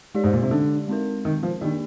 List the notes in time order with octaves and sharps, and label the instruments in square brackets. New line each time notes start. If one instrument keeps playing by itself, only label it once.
[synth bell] G#3 D#4 G4 D5
[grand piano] G#2
A#2
C3
D3
[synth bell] G#3 C4 D#4 A#4
[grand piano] D#3
F3
[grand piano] D#3 [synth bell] A#3 D4 G4 D5